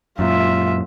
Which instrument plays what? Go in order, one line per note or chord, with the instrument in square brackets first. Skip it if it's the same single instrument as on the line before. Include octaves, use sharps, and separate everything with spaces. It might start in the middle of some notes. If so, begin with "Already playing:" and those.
[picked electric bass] F#2 A#2 [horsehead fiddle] F4 E5